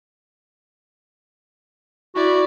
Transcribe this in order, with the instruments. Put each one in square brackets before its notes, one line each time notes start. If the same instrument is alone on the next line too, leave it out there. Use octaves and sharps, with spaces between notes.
[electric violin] E4 D5 [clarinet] F#4